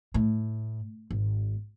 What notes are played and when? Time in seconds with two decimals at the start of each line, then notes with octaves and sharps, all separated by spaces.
0.14 A2
1.11 G#1